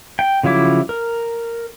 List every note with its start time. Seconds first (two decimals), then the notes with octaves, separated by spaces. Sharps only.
0.19 G5
0.43 C#3 F3 F#3 E4 D6
0.89 A#4